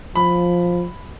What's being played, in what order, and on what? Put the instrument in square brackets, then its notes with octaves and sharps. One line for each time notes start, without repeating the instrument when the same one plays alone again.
[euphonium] F3 [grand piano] B5